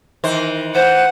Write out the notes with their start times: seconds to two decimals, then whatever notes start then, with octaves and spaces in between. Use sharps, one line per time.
0.24 D#3 E3 C5
0.75 E3 C5 F#5